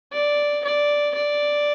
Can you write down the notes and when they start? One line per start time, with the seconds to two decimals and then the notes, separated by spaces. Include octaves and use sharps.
0.13 D5
0.64 D5
1.14 D5